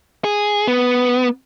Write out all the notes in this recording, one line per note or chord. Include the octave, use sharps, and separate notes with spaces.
G#4
B3